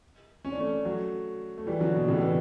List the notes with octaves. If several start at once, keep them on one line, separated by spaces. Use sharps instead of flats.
C#4
D4
A3 C#4
F#3 A3
A3
E3 G3
D3 F#3
B2
A2 C#3
C#3 E3